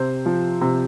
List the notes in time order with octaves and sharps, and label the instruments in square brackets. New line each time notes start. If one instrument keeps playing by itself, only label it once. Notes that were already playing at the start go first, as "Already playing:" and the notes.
Already playing: [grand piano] C3 C5
F3
C3